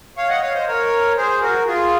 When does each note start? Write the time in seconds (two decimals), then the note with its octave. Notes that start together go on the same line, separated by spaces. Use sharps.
0.17 C#5 F5
0.29 D#5 F#5
0.42 C#5 F5
0.54 C5 D#5
0.68 A#4 C#5
1.16 G#4 C5
1.41 F#4 A#4
1.67 F4 G#4